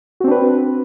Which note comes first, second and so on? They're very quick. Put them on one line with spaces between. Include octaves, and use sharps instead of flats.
F#4 C4 D4 B4